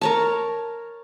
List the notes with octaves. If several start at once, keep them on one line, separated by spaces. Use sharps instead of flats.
A#4 C#5 A5